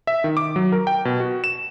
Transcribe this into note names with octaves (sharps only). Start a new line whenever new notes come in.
E5
D#3
D6
F#3
A#4
G5
B2
F#4
E7